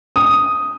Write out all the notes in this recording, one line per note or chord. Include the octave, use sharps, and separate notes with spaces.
D#6